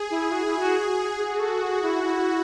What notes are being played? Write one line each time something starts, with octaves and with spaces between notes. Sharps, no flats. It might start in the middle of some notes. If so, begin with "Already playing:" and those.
Already playing: G#4
E4
F#4
E4
F#4
F#4 G#4
A4
G#4
E4
E4